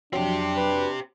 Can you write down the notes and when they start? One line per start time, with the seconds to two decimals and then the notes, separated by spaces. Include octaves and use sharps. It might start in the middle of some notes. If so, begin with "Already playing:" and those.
0.13 F2 F#3 C4 D4 G4
0.57 B4